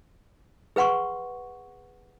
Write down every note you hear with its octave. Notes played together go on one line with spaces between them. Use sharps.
G#4 B4 F#5 C6 C#6